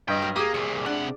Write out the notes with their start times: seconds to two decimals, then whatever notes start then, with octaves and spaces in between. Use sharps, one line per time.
0.08 G2 F#3 D#5 G5
0.22 A#4
0.36 A#3 G4 G#4 D#6
0.54 C2 A#2 C#6
0.86 C3 D4 F#5